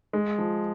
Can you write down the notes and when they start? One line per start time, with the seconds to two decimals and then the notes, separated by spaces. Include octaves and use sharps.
0.13 G#3
0.38 F3